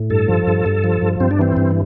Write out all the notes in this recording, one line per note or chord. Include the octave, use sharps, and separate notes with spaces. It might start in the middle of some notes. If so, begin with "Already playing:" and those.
Already playing: A2
G2 A4
F3
G2
G2
F3
G2
G2 C4
D4
E3 C4
G2